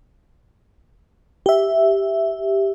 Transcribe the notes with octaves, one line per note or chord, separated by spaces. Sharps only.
G4 E5